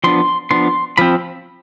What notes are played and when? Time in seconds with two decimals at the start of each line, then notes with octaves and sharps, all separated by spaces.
0.04 F3 B3 D4 C6
0.51 F3 B3 D4 C6
0.97 F3 C4 B5